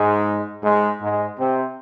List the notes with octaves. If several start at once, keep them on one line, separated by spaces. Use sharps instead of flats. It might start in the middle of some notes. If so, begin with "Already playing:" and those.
Already playing: G#2 G#3
G#2 G#3
G#2 G#3
C3 C4